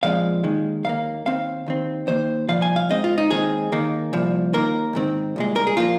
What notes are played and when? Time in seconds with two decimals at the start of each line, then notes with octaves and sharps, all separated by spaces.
0.03 A#2 F3 G#3 C4 F5
0.43 D#2 D#3 G#3
0.84 D#2 D#3 A#3 F5
1.26 D#2 D#3 C4 F5
1.66 D#2 D#3 C4
2.07 D#2 D#3 A#3 C5
2.49 C2 A#2 F3 F5
2.62 G#5
2.76 F5
2.89 G#2 G#3 C4 D#5
3.04 F4
3.18 D#4
3.31 D#2 D#3 G#3 C4 G#4
3.72 D#2 D#3 A#3
4.13 C2 A#2 F3
4.53 D#2 D#3 A#3 A#4
4.95 G#2 D#3 C4
5.36 C2 A#2 G#3
5.56 A#4
5.67 G#4
5.77 A#2 F3 A#3 F4